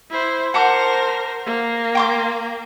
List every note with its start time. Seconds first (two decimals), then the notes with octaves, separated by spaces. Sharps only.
0.10 E4 C5
0.54 A#4 C5 F#5 A5 D6
1.46 A#3
1.95 G5 C6 D6